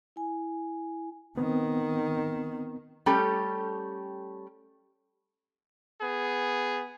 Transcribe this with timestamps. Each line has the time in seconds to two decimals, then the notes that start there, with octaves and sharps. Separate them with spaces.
0.16 E4 G#5
1.37 D#3 B3 C4
3.06 G3 A3 C#4 G4 A4
6.01 B3 G#4